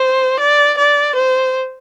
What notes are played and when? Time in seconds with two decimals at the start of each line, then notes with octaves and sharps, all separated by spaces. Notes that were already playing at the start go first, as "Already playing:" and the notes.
Already playing: C5
0.40 D5
0.78 D5
1.16 C5